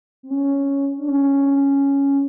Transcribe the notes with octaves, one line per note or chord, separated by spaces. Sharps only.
C4
C#4
D4
C#4